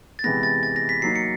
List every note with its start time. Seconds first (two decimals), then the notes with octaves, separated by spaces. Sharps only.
0.19 A6
0.24 C3 E3 G#3 B3 A#6
0.43 A6
0.63 A6
0.76 A#6
0.89 B6
1.02 F#3 A#3 D#4 C7
1.16 C#7